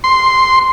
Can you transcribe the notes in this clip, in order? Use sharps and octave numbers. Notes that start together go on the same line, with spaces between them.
C6